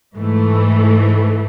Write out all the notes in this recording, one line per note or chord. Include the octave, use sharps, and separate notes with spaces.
G#2 E3 A3